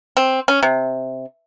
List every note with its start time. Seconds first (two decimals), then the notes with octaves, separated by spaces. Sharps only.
0.17 C4
0.48 C#4
0.63 C3